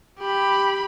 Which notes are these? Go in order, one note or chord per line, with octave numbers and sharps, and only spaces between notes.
G4 B5